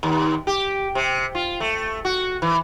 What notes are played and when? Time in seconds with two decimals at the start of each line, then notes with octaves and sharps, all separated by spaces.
0.03 D#2
0.47 G4
0.95 C3
1.35 F4
1.60 A3
2.05 F#4
2.42 E3